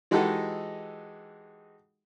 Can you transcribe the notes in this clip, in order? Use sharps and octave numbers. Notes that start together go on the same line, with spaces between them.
E3 G#3 D#4 F#4 G4 A4